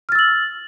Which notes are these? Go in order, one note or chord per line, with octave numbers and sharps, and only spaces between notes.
E6 F6 A6 F#7